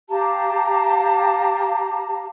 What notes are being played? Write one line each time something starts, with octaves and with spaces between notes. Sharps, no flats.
G4 F5 A5 A#5